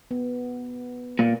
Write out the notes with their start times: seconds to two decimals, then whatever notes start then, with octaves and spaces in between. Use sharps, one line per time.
0.11 B3
1.19 A#2 A#3